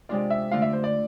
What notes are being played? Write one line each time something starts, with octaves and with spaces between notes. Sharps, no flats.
C3 G#3 D4 F4 D5
E5
D3 A3 D4 F4 F5
E5
C5
D5